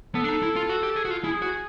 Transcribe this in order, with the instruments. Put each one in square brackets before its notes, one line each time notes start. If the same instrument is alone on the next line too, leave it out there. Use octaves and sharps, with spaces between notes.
[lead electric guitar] B3 [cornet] A4
[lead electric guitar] D4
D#4
E4
F4
F#4
G4
G#4
F#4
F4
[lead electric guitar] E4 [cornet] G#4
[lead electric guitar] F#4